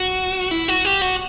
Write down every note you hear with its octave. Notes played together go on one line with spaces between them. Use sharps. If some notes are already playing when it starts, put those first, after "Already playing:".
Already playing: F#4
E4
F#4
G4
F#4